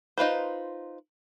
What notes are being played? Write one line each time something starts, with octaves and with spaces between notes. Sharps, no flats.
D#4 F4 B4 C5